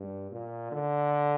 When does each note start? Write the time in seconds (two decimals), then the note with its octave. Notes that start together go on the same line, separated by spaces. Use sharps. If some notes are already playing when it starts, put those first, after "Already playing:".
Already playing: G2
0.31 A#2
0.72 D3